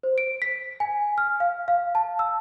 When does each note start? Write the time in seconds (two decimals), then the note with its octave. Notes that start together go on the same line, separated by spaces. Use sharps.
0.03 C5
0.18 D7
0.42 B6
0.80 G#5
1.18 F6
1.40 F5
1.68 F5
1.95 A5
2.19 E6